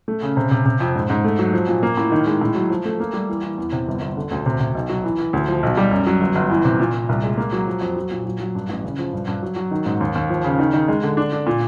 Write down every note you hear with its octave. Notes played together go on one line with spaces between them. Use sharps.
A3
C#3
C3
C3
C3
F2
G#2
G#2
A3
F#3
F3
A#2
A#3
A2
D#3
G#3
A2
F#3
F3
A3
A#3
G3
E3
E3
E2
C3
G1
G1
D3
D2
C3
C3
B1
F#3
E3
E3
D2
F3
B1
G3
F#2
F#3
G1
G1
E3
C3
A#2
A#2
C2
G#3
A#3
F#3
F3
F2
F#3
A#2
F#3
F#3
G2
A1
C#3
F3
G2
G2
F#3
F#3
D#3
G#2
D#2
D#2
F3
C#3
D#3
D#3
G#3
D3
D4
D4
A#2